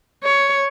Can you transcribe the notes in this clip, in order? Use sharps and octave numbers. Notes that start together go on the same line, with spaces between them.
C#5